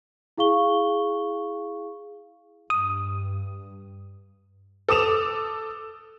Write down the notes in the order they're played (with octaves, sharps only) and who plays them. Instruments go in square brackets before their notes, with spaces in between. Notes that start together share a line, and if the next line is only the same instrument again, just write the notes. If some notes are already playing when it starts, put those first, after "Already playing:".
[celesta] E4 G#4 F5 C#6 G7
[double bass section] G2 [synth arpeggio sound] D#6
[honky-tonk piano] A4 D6 D#6 E7 F7